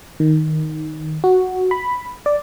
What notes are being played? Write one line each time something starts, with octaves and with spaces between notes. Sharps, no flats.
D#3
F#4
B5
D5